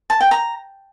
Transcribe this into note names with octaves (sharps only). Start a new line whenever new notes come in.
A5
G5
A#5